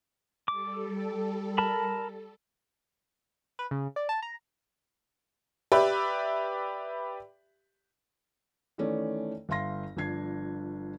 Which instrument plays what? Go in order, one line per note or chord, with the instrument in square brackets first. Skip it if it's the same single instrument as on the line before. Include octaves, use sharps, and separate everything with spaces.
[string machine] G3 A4 [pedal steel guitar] D6
[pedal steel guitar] A#4 A5 B5
[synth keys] B4
C#3
D5
A5
A#5
[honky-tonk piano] G4 B4 D5 E5 B5
[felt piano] D#3 E3 A3 C#4 A4 D5
G1 E5 F5 C6 A#6
G1 F3 D4 G#6 C7